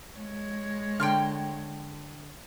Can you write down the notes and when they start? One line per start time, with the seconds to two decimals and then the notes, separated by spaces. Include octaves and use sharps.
0.15 G#3 C#5
1.00 D3 G5 C6 F6